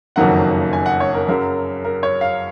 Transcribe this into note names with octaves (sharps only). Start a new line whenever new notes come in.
F#1 F2 D#3 F#3 A#3 F#5
G#5
F#5
C#5
A#4
F#2 C#3 F#3 A#4
A#4
C#5
F5